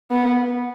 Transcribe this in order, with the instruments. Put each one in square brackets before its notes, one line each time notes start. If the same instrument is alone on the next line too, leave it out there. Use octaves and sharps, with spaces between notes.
[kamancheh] B3